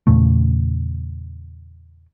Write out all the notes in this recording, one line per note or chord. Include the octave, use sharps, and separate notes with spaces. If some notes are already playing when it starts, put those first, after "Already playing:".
E2 A#2 C#3 A3